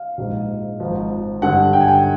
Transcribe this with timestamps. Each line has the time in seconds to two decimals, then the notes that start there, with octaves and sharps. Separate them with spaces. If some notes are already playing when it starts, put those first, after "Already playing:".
Already playing: F5
0.18 A#1 G#2 F3 G#3
0.80 G#1 G#2 F3
1.42 G2 D3 G3 F#5
1.73 G5
1.80 G#5
1.88 G5